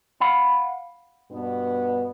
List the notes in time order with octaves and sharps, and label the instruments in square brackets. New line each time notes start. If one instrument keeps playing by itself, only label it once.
[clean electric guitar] F5 F#5 B5
[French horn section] G2 B2 B3